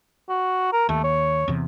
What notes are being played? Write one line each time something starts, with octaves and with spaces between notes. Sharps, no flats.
F#4
A#4
D#2 A3
C#5
E2 C3